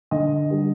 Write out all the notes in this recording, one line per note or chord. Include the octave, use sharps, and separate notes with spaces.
D3 D#5
G3